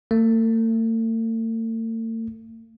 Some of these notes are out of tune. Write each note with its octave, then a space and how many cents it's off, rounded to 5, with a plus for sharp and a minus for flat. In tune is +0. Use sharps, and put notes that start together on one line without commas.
A3 +45